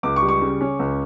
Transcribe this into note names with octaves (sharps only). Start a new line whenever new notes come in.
C#2 D6
C#6
G3
C#6
C#3
C#4
C#2